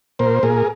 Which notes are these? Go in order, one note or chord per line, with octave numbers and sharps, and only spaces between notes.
A#2 A#4 C5
A#2 G#4 A#4